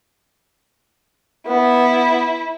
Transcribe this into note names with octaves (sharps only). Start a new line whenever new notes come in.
B3 E4